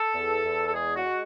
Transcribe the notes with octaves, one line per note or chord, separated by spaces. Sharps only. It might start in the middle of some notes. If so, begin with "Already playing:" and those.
Already playing: A4
E2
E2
A4
G#3 G#4
F#4
G#3